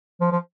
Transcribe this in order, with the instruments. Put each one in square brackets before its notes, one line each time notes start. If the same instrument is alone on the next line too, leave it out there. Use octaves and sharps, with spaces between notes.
[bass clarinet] F3
F3